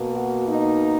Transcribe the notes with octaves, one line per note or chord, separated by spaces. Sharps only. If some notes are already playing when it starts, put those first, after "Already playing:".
Already playing: B2 A#3
F#4
D#4